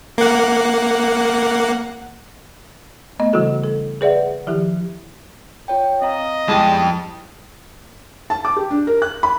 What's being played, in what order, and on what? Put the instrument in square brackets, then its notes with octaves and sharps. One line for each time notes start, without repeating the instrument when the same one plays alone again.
[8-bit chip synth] A#3 F#5
[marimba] A3 B3 D#5
C#3 E3 G3 E4 F#4 A4
A4
G#4 B4 D5 E5 F#5
D#3 F3 E4 G4
[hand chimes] F4 C#5 G5
[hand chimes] C4 F5 A#5 [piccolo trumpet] D#5
[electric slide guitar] F2 A5 [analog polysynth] G3 G#3 D#6 [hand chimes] B3 E4 G5
[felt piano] A5
D6
G4
D4
A#4
F#6
B5